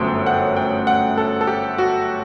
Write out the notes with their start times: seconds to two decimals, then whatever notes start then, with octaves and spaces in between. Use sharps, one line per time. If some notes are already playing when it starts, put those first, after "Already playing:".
Already playing: G1 F#2 F#3 A3 C5 G5
0.26 F#5
0.56 G5
0.87 F#5
1.18 A4
1.41 A4
1.47 G4
1.78 F#4